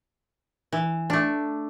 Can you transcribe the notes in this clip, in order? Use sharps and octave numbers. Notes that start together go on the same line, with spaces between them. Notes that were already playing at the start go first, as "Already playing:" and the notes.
E3
A3 D4